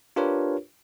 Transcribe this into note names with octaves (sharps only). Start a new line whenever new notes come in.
D4 F4 G4 A#4 B4 C#5